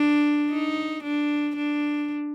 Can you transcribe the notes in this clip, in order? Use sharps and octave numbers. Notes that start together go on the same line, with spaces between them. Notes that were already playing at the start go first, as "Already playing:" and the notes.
Already playing: D4
D#4
D4
D4